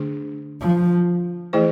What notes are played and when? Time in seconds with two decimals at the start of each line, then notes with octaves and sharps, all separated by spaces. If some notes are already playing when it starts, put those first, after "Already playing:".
Already playing: D3 A3 D4 G#4
0.61 F3
1.53 E3 A3 E4 G#4 C5